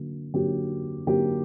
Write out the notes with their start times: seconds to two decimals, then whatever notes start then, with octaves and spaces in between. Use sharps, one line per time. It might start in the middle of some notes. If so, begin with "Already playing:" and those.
Already playing: D3 F#3 A#3
0.34 D3 F#3 A#3 G4
1.07 D3 F#3 A#3 G4